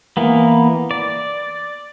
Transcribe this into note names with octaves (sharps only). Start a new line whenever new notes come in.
E3 A#3 B3
D5